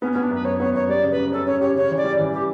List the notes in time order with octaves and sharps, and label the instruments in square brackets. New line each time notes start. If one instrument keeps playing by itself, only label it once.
[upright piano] B3 [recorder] C#4
[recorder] C#4
[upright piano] B3
[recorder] D4
[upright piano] F#2 [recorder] B4
[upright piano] F#2 [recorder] C#5
[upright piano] B3 [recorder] C#5
[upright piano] F#2 [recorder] C#5
[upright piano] G3 [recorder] D5
[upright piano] C#3
[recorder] B4
[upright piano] C#3
[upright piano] C#4 [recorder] A4
[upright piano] C#4 [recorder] C#5
[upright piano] G4 [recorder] C#5
[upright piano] C#3 [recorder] C#5
[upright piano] E3
[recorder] D5
[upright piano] G3
E3
[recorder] G4